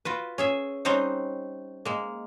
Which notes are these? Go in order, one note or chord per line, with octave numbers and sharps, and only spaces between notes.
F4 F#4 B4
C#4 G#4 E5
G3 C4 C#4 D#4 C5 F#5
G#3 A#3